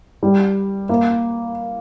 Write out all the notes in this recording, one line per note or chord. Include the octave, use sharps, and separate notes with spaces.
G3
A#3